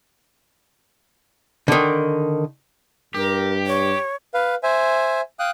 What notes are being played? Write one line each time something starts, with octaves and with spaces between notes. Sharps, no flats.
D3 D#3
G2 G4 A#4
C#5
B4 F5
C5 E5 G#5
F5 G5 D#6 F#6